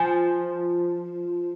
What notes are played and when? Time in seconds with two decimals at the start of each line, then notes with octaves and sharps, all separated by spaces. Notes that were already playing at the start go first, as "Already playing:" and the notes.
Already playing: F3 G#5